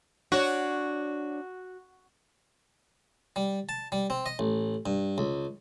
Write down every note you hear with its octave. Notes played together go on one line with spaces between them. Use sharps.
D4 F#4 C#5 D5
G3
A5
G3
C4
D#5
A1
G2
C#2